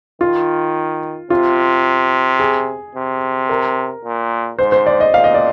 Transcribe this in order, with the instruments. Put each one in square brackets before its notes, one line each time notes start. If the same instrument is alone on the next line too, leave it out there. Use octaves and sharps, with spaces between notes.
[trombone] D#3 [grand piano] F4
[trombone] C3 [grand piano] F4
[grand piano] G#4
[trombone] C3
[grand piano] A#4
[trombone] A#2
[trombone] G#2 [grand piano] C5
[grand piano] C5
D5
D#5
[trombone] A#2 [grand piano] F5
[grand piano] D#5
D5